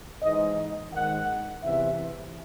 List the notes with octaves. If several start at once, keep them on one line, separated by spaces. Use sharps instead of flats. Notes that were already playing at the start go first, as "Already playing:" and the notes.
G#2 E3 D#5
G#2 D#3 F#5
E2 C3 E3 E5